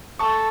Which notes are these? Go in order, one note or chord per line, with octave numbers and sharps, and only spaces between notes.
A4 A5 C#6